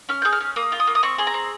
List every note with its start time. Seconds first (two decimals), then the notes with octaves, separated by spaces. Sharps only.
0.09 C#4 F6
0.22 G#4 G6
0.33 F6
0.41 C#4
0.56 A#3 D#6
0.72 F4
0.80 D#6
0.87 A#3
0.95 D#6
1.03 C4 C#6
1.18 G#4 C6
1.27 A#5
1.34 C4